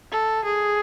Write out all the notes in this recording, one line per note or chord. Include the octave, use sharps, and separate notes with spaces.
A4
G#4